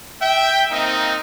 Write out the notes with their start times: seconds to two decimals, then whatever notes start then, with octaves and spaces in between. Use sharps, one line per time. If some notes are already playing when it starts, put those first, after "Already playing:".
0.21 E5 G5
0.71 A#3 C4 D#4